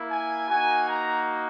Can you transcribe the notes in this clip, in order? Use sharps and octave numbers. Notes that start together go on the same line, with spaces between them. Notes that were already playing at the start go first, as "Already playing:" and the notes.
Already playing: A#3 E4
G#5
A#3 D#4 F#4 G#5
A#5